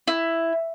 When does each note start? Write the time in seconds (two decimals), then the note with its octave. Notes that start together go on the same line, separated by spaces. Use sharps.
0.08 E4